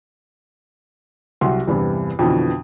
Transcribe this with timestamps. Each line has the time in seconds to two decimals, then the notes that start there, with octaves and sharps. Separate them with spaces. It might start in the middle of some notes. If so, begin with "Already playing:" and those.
1.41 C2 F#3 F#5 C6
1.68 E2 G2 C3 E3
2.19 F2 B2 D3 E3